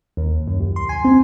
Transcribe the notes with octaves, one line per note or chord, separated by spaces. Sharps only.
D#2
F#2
C2
C6
G#5
C4